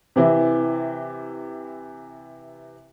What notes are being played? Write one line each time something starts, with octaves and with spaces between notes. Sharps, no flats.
C3 E3 E4